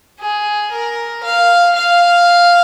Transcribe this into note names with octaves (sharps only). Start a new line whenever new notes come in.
G#4
A#4
F5
F5